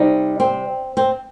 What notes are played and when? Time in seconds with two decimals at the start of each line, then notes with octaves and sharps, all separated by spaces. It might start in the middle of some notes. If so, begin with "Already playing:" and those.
Already playing: C3 G3 D#4
0.40 C4
0.97 C4